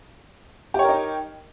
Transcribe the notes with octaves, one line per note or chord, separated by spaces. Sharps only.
D#4 G4 A#4 C#5